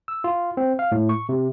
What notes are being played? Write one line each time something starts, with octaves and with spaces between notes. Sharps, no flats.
E6
F4
C4
F5
A2
C#6
C3